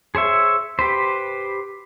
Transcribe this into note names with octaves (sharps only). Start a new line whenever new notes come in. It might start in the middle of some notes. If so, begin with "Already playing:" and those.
G#4 C5 C#5 E5
G4 B4 C5